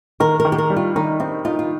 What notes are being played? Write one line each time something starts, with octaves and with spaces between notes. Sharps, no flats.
D#3 A#4
A#4
D#3
G4
A#4
G3
F4
D#3 D#4
C4 D#4
D#4 F4
F4